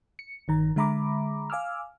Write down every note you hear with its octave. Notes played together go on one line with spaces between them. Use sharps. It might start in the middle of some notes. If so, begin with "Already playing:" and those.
C#7
G1 D#3 A#5
D3 G#3 E5 A#5 B5 D6
F5 G#5 D6 E6 F6